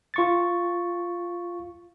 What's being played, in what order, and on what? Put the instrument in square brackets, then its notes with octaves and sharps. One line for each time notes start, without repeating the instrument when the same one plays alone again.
[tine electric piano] F4 C#6 A6